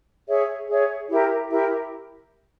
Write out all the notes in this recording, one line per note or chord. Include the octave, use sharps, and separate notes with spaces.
G#4 C#5 E5
G#4 C#5 E5
E4 G4 A#4 E5
E4 G4 A#4 E5